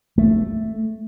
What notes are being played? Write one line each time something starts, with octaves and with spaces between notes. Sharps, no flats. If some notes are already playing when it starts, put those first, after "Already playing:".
A3